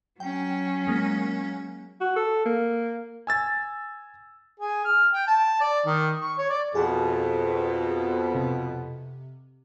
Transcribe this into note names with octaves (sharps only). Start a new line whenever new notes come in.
F#3 C#4 G5
G#3 A#3
F#4
A4
A#3
G#5 E6 A6
G#4
F6
G5
A5
D5
D#3
C#6
C#5
D5
F2 B2 G#4
C3